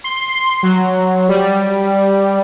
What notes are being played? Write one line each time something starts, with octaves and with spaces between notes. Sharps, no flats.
C6
F#3
G3